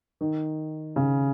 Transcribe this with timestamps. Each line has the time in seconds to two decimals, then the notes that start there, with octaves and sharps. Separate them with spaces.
0.21 D#3
0.96 C#3